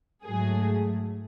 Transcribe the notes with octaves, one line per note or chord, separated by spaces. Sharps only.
G#2 F#3 A3 G#4